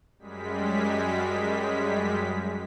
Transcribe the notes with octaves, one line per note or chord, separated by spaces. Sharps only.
F#2 G3 G#3 B6